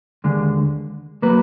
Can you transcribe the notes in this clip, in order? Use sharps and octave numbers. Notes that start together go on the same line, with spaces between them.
D#2 D3 G#3
F#3 A#3 B4